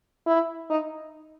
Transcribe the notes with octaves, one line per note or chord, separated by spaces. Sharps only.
E4
D#4